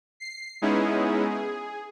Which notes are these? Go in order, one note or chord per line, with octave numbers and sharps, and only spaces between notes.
C7
G#3 B3 C#4 D#4 E4 G#4
G#4